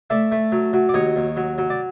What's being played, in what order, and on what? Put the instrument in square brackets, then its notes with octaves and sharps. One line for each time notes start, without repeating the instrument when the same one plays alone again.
[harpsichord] A3 D5 E5
A3
F#3
F#3
D5
D#2 C#5 D#5
D#2
F#3
F#3
D5